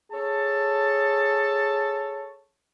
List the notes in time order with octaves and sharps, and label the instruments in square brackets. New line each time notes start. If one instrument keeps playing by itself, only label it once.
[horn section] G#4 A4 C#5 A5